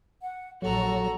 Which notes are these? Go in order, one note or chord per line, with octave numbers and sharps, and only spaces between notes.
F#5
A#1 F#3 F#4 A4 A#5